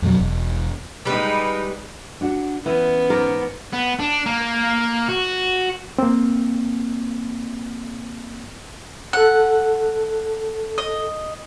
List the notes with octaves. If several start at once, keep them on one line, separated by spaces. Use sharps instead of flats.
F2 B2 F3 F#3
E1 E2
G3 G#3 D#4 B4
D4 F#4 F#5
E3 B3 C#4
G#2 A#4 D5
B3
D4
A#3
F#4
A#3 C4
A4 F#5 F#6
D#5